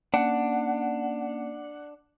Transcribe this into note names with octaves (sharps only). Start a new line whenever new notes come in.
A#3 C#4 D4 F#5